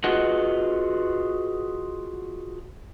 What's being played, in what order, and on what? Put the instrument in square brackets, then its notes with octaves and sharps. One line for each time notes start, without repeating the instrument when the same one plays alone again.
[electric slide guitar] F4 F#4 G#4 B4 D#5 F#5